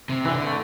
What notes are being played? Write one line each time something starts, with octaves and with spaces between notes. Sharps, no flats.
C3
D3 E3
A3